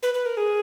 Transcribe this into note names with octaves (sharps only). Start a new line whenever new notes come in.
B4
B4
A#4
G#4